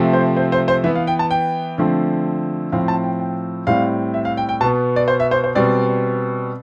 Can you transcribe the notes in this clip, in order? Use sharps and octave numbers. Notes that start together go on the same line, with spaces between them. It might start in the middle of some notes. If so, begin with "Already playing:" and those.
Already playing: C3 F3 A3 C4
C5
C5
C5
C5
E3 B3 E5
F5
G5
A5
G5
D3 F3 A3 C4
A2 F3 C4 F5
A5
G5
G5
A2 G3 C4 F5
E5
F5
G5
G5
B2 B3 A5
D5
C5
E5
C5
C5
B2 G3 C4 D5